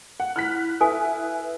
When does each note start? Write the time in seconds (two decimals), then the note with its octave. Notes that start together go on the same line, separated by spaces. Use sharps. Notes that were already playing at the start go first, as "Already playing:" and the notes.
0.20 F#5
0.36 E4 F6 F#6 B6
0.81 E4 A4 B4 G#5